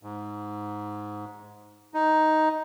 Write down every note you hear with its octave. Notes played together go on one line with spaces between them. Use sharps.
G#2
D#4